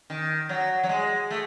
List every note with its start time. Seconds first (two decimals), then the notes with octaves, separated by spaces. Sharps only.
0.10 D#3
0.49 F#3
0.84 F#3
0.89 G#3
1.31 A3